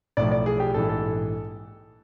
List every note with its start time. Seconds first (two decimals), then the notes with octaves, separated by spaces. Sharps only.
0.17 B1 A2 F3 D5
0.32 D5
0.46 G#4
0.60 G4
0.74 A#1 G#2 E3 A4
0.89 A4